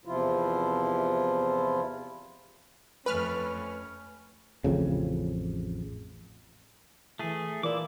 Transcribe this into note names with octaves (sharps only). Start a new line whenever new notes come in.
E2 C3 F3 E4 F4
F2 A3 C#4 B4 F6
A1 F2 C#3
E3 A3 E4 G#4
A#2 E3 E4 D6